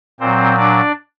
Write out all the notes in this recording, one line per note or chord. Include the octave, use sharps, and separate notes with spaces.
A#2 F#3 C4 C5
D4 D5